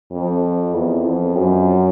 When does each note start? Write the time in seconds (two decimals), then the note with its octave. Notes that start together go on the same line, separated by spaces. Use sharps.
0.11 F2
0.74 E2
1.05 F2
1.36 F#2